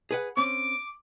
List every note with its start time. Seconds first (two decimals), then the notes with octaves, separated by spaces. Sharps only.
0.11 G#4 B4 F#5
0.37 C4 C#4 D6